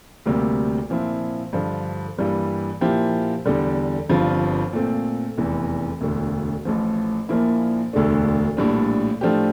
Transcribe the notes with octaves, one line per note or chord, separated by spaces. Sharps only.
D2 C3 G3 A#3
A#2 F3 C4 E4
G2 D3 F3
G2 E3 G3 A#3
A#2 F3 A#3 E4 G4
E2 D3 G3
G1 G2 F3 C4 F4
A#2 A3 C4
F1 E2 E3
E1 D2 D3
A1 A2 F3
A#1 A#2 F3 A#3 E4
E1 D2 D3 A3 D4
A#1 A2 G3 D4
A2 F3 A3 D4 G4